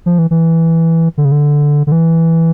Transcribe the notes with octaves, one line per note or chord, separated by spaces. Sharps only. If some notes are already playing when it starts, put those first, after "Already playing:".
F3
E3
E3
D3
C#3
D3
D3
E3